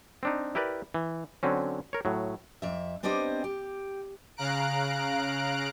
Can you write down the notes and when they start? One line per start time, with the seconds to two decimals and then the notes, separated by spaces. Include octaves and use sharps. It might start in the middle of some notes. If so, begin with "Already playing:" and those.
0.23 C4 D4 D#4
0.55 E4 G4 A#4 B4 D5
0.94 E3
1.43 D3 F#3 C4 C#4
1.93 A#4 C#5
2.05 A2 F#3
2.62 F2 E5
3.03 B3 C4 D4 G4 C5 D#5
3.44 G4
4.37 C#3 F5 A#5 F#6 D7